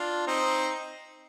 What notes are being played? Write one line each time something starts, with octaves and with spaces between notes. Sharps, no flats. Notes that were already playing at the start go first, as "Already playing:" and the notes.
Already playing: D4 F4
C4 D#4